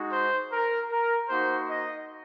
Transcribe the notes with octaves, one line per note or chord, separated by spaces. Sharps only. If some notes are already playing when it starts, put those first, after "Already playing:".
Already playing: G#3 D#4 F#4
C5
A#4
A#4
A#3 D#4 F#4 C5
D#5